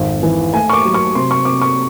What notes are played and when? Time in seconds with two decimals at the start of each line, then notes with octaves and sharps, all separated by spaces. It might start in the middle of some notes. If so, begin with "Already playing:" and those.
Already playing: G#1 F2
0.23 E3
0.53 A3 G#5
0.69 C#6
0.73 D6
0.84 F#3
0.94 C#6
1.15 C3 C6
1.31 C#6
1.45 C3 D6
1.62 C#6